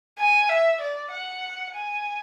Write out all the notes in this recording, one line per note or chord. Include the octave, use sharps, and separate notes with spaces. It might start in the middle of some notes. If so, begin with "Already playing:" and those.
G#5
E5
D5
F#5
G#5